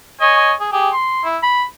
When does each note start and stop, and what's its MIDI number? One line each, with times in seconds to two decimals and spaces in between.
0.21 0.52 73
0.21 0.52 75
0.21 0.52 80
0.61 0.72 68
0.73 0.90 67
0.73 0.90 68
0.93 1.24 84
1.25 1.38 64
1.43 1.64 83